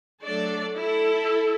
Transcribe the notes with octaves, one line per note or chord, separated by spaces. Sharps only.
F#3 A3 D4 A4 D5
E4 A4